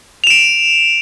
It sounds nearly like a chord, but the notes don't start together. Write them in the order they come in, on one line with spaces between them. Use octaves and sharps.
F7 E7 D7